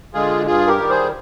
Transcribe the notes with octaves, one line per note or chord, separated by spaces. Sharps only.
D3 G#3 F4 G#4
G2 F4 G#4
G4 A#4
D#3 G3
G#4 C5